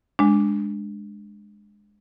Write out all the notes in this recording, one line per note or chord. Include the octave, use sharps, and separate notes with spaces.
G#3 D4